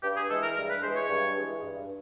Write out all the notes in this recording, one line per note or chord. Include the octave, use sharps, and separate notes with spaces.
G2 G4
G#4
E3 G#3 A4
A#4
G2 A#4
B4
E3 G#3 C5
C#5
G2
E3 G#3
G2